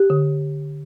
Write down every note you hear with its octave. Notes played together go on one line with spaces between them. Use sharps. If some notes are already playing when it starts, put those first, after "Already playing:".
Already playing: G4
D3